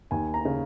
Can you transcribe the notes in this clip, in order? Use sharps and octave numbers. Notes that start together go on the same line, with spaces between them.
D#2 G#5
A#5
C#3